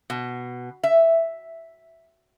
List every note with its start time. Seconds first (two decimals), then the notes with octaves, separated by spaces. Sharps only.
0.10 B2
0.83 E5